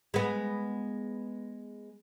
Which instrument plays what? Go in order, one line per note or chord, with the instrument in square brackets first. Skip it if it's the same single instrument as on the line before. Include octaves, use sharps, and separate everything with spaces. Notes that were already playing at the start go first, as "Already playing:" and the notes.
[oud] G#3 B3